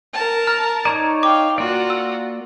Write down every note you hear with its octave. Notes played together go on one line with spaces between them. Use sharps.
A#4 A5
A#5 F6
D#4 C#5 D5 A#5
F5 G5 D6
A#3 F4 F#4 D5
E6